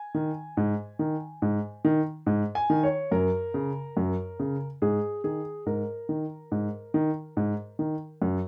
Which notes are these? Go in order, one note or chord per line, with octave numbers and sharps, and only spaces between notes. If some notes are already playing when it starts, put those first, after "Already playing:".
Already playing: G#5
D#3
G#2
D#3
G#2
D#3
G#2
G#5
D#3
C#5
F#2 A#4
C#3
F#2
C#3
G#2 G#4
D#3 G#4
G#2 A#4
D#3
G#2
D#3
G#2
D#3
F#2